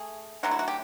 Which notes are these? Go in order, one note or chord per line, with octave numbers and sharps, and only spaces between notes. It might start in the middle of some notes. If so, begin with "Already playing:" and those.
Already playing: A3 G#4
D3 F#3 A3 F#4
E4
F#4
G4